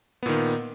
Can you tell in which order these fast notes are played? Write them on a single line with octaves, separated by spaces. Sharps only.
B3 A#2 D#3